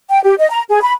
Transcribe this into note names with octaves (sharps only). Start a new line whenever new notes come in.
G5
G4
D#5
A#5
G#4
B5